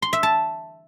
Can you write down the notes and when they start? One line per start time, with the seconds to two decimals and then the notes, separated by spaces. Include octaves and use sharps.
0.02 C6
0.13 E5
0.23 A5